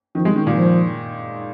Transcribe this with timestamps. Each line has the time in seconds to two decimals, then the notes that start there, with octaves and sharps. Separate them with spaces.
0.15 D#3 F3
0.25 G#3
0.36 D#3
0.47 A#2
0.57 F3